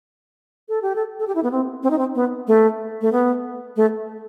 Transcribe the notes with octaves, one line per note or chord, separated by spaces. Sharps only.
A4
G4
A4
A4
G4
E4
B3
C4
C4
D#4
C4
B3
A3
A3
B3
A3